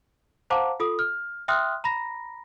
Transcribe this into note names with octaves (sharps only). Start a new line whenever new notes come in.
C5 F5 F#5 A5 A#5 D6
F4 A4 D#6
F6
E5 G5 C6 D#6 F6 F#6
A#5 B5 A#6